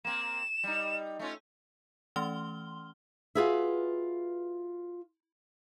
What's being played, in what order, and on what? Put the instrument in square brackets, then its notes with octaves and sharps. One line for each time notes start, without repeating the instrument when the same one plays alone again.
[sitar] A#3 C4 [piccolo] E7
[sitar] G3 D#4
A3 C#4 F4
[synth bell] E3 A3 C#4 C6 F6 G7
[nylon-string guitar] F4 F#4 G#4 B4 E5